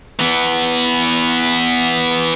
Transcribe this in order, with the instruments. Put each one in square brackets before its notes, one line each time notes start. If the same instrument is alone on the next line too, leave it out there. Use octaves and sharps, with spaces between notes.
[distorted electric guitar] E3 B3